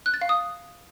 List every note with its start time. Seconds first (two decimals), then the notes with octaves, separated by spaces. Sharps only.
0.06 F#6
0.14 A6
0.21 F5
0.29 D#6